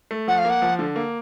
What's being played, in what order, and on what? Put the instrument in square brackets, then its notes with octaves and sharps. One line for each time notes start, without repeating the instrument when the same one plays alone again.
[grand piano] A3
[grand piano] F3 [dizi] F#5
[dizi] F5
[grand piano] A#3 [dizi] F#5
[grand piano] F3
D3
A#3